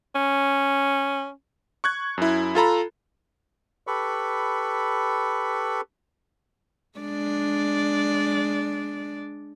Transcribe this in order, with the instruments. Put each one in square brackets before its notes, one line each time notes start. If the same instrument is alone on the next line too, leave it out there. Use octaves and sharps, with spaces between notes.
[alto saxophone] C#4
[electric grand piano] C#6 F#6 G#6
F#2 E4
F4 A4 A#5 B5
[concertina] G4 A4 B4 B5 C#6
[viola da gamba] G#3 D4 D5